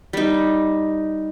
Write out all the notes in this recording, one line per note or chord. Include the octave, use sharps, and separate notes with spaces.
G3 D#4